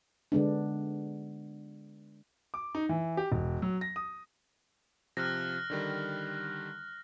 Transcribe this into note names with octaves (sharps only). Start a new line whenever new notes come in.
D3 G#3 B3 D4
D6
D#4
E3
G4
E1
F#3
A#6
D#6
C3 F3 F6 F#6 A#6
D3 D#3 G3